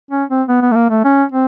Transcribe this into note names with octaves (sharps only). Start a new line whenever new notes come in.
C#4
C4
B3
B3
A3
A#3
A3
C#4
C4